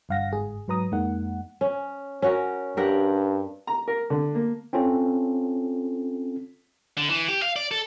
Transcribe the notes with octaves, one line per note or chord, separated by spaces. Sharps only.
G1 G2 F5 F#5 A#6
G1 G#2 G#4
G#2 F#3 B4 A#5 D#6
F2 G#3 A#3 D#4 F#5
C#4
C#4 F#4 A#4
G2 G4 A#4 F#5
A#5
A#4
D3
A#3
C4 C#4 F4 A4
D3
E3
G4
F5
D5
A4